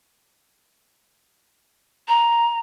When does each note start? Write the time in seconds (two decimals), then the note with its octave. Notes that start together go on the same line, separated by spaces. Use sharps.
2.08 A#5